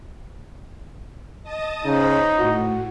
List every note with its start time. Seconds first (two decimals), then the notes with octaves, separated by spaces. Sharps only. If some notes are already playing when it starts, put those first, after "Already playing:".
1.43 D#5 A5 D#6
1.85 C#3 D#4 C5 C#5 B5
2.39 A2 F#4